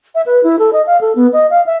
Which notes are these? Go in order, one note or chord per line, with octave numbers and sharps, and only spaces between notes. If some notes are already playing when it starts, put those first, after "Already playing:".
E5
B4
E4
A4
D#5
F5
A4
B3
D#5
F5
E5